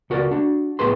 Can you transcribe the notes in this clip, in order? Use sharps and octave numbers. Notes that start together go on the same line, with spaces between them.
C#2 F#4 A#4 D5
D4 F#4
A2 B3 G#4 B4 C6